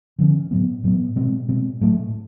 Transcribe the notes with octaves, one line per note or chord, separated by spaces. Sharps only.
D3 F3 A3 C#4
A2 F#3 B3
A2 F#3 B3
B2 G#3 C4
B2 G#3 C4
A2 F#3 A3